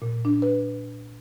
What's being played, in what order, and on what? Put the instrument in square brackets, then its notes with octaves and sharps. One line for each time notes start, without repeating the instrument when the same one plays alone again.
[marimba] A#2
D4
B4